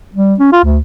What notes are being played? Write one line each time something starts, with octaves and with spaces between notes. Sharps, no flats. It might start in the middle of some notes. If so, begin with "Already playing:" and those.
G3
C#4
F4
D2